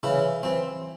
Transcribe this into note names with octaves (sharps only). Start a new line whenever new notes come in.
C#3 E3 E4
E3 C4